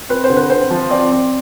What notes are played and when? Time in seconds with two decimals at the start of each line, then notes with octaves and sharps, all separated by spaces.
0.09 C4 B4
0.24 C5
0.30 D3
0.37 B4
0.50 C4 C5
0.71 F3
0.90 C4 D5
1.11 C4